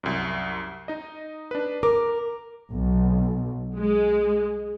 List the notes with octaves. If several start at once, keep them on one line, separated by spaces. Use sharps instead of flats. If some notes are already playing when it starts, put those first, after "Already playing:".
C2 F#2
D#4 D#5
D4 B4
A#4 D6
B1
G#3